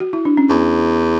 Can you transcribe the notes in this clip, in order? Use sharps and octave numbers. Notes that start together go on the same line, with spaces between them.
F#4
E4
D4
C#4
E2 B3